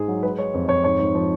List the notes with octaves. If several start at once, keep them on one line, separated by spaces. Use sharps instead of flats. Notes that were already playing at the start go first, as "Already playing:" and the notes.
Already playing: G#2 G#4
F#3
G#3 B4
G#3 C#5
F2
F2 C#5
G#2 C#5
G#2
F3